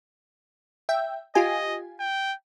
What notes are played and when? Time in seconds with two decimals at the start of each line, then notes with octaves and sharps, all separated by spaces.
0.89 E5 G5
1.35 F4 G4 D#5 G#5
2.00 G5